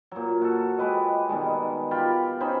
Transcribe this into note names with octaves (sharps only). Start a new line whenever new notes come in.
A#2 F#3
F#4 A4
G#3 G4 B4 D#5
B2 D#3 G3 G#3
F4 G4 G5 B5
C#4 D#4 C5 B5